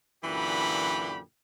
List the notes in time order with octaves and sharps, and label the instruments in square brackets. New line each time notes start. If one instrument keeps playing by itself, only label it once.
[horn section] F#2 A#2 D3 E3 G4 B5